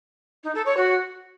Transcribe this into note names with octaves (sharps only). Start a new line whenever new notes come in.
D#4
A4
C#5
F#4